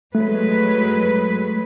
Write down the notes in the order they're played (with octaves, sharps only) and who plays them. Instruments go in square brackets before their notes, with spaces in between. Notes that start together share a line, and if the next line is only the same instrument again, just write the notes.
[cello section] F#3 G#3 B4 [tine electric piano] A3